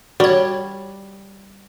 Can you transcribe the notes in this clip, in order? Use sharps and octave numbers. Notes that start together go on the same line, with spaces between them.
G3 F#4 C#5